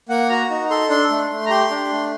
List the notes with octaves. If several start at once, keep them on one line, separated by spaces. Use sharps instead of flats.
A#3 F#5
F#4 A#5
D#4
A4 C6
D4 C6
A3
A3
A#5
G4 C6
D4
A3